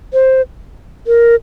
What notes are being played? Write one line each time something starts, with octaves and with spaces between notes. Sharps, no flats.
C5
A#4